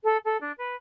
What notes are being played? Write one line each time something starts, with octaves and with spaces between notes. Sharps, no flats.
A4
A4
D4
B4